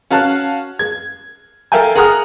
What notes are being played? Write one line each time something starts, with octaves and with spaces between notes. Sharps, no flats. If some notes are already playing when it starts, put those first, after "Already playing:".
C#4 F#4 F5 A5 F#6
G#6
A4 A#4 E5 F5 G5 G#5
G#4 A#4 F#5 A#5 D#6 F6